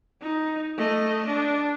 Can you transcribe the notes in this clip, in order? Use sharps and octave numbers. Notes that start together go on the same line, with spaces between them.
D#4
A3 D#5
D4